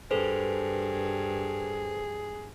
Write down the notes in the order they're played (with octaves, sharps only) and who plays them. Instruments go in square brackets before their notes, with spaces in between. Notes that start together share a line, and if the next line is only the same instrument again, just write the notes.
[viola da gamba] G2 [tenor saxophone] G#4 [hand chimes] A4 B4 C5